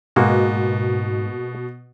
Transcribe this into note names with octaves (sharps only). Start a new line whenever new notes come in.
G#2 B2 G#3 A#3 F#4